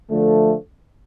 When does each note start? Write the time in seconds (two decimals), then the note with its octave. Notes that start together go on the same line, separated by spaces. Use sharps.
0.10 D3 F3 A3